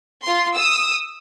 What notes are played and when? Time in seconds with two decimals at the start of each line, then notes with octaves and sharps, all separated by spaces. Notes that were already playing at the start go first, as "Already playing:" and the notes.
0.23 F4 C6
0.54 D#6 E6